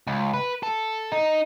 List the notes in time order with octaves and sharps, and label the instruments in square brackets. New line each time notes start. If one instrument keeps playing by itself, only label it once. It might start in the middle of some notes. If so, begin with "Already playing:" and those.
[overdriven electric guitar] C#2
B4
A4
D#4